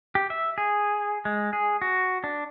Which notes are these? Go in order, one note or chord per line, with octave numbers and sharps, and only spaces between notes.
G4
E5
G#4
G#3
G#4
F#4
D4